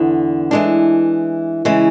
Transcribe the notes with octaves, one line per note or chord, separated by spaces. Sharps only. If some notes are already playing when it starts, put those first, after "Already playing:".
Already playing: E2 D3 B3
E3 G#3 D4
C#3 E3 G#3